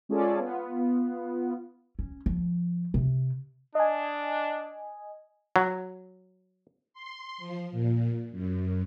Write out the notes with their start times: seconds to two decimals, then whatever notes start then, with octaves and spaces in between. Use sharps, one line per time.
0.09 G#3 C#4 F4 G#4 A4 D5
0.39 B3 F4
1.99 C#4
2.26 F3
2.94 C3
3.75 D4 D#5 G#5
5.56 F#3
6.94 C6
7.38 F3
7.72 A#2
8.31 F#2